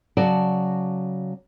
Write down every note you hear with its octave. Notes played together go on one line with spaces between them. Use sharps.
C#3 F#3 F#4 D5 A5